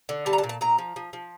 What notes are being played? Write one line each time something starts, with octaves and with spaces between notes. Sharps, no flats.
D3
G3 A5
A#5
A5
A#2
A5
A#2 A#5
F3
F3
F3